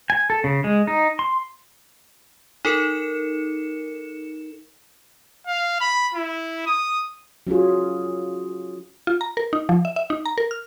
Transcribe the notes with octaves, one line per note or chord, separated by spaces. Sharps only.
G#5
A4
C#3
G#3
D#4
C6
D#4 A4 A#4 C#7 E7
F5
B5
E4
D#6
F#3 C#4 F4 G#4
F4
A#5
A#4
D#4
F3
E5
E5
D#4
A#5
A#4
F6